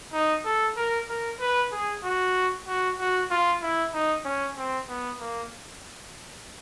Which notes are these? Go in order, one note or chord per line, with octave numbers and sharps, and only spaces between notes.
D#4
A4
A#4
A#4
B4
G#4
F#4
F#4
F#4
F4
E4
D#4
C#4
C4
B3
A#3